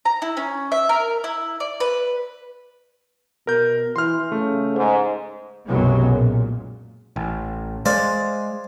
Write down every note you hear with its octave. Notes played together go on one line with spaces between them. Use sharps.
A#5
E4
C#4
E5
A#4
E4
D5
B4
B2 A#4 G6
E3 C6 F6
C#3 A3
G#2
B1 F#2 C3 F#3 G#3 B3
A#2
A1
G#3 C5 D5 F5